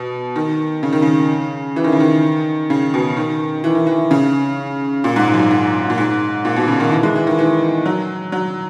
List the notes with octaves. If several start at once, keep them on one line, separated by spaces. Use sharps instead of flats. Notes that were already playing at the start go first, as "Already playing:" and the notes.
Already playing: B2
D#3
C#3
D#3
C#3
E3
D#3
C#3
D#3
C#3
B2
D#3
E3
D#3
E3
C#3
A#2
G#2
G#2
F#2
G#2
G#2
A#2
G#2
A#2
B2
C#3
D#3
E3
G#3
E3
D#3
E3
F#3
F#3